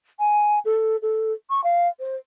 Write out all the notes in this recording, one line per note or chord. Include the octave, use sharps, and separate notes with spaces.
G#5
A4
A4
C#6
F5
C5